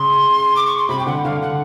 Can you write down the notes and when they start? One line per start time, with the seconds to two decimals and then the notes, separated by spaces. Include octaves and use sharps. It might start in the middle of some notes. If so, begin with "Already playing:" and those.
Already playing: C#3 C6
0.56 D6
0.67 C#6
0.77 C6
0.89 C3 B5
0.99 G5
1.07 D3 F#5
1.24 D3 F5
1.42 F#5